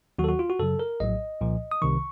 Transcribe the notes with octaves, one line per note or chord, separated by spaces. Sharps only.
D#2 D#3 F#3 F#4
A4
F#4
F4
F#4
F#2 C#3 F#3 A4
A#4
A#1 A2 F#3 D#5
C2 A#2 F3
D#6
C2 C3 D#3 C#6